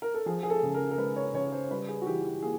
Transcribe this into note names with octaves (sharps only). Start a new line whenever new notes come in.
A#4
A4
F3 G#4
G#4
A4
C#3
A#4
A#4
G#3 B4
C#5
C#3 C#5
C5
G3 B4
G#4
F#4
E3 G4
G4
A#3 G#4